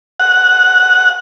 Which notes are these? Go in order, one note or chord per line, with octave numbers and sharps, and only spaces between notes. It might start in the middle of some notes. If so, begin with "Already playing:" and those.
F#5